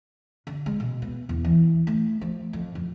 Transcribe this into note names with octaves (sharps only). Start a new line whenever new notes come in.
D3
G#3
B2
B3
E2
E3
A3
F3
F2
F2